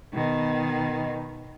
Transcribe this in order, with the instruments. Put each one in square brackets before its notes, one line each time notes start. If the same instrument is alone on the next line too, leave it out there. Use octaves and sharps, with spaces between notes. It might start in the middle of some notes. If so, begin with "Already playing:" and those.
[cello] B2 D#3